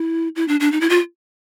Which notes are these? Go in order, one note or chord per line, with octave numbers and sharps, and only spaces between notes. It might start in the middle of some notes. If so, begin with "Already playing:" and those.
Already playing: E4
E4
D4
D4
D#4
E4
F4